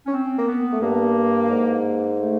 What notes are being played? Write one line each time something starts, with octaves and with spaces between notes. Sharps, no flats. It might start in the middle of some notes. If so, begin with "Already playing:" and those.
C#4
C4
A#3
B3
A3
G2 A#3
G#2
A3